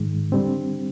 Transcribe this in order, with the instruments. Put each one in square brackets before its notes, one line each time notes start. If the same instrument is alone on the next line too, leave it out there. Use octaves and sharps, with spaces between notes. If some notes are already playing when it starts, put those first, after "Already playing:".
Already playing: [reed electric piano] G#2 D#3 G#3
D3 G3 C4